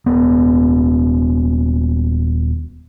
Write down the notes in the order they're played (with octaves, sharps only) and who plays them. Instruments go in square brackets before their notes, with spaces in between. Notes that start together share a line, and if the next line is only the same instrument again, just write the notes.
[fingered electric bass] D#1 B3